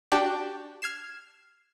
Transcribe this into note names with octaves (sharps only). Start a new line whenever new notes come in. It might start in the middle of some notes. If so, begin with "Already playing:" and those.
D4 F#4 G4 D5 G5 A5
F6 G#6 C7 E7